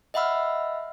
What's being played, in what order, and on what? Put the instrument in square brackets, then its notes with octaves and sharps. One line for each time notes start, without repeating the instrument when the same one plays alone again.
[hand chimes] D#5 E5 F#5 B5 E6 F6